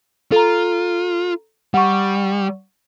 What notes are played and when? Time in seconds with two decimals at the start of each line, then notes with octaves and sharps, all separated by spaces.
0.32 F4 A4 A#5
1.74 G3 F#5 C#6